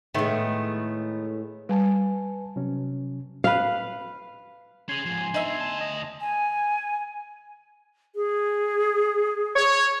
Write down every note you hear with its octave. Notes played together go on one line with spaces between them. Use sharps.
A2 D#3 G#3 A3 B3
G3 B4 G#5 A5
C3 F#3 C#4
B4 F5
C#4 G#4 G#5 C6
G#2 F3
B3 D4 D#4 E5
D2 A5
D#5
G#5
G#4
C#5